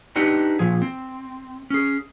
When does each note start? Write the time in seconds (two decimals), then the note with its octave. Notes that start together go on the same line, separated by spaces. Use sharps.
0.16 C4 D4 D#4 G4 B4 F#5
0.59 A#2 F3 G#4
0.82 C4
1.70 C#4 G#4